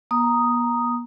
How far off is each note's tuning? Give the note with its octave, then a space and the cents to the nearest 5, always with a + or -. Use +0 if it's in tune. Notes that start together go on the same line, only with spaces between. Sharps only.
B3 -45 A#5 +0 D#6 +0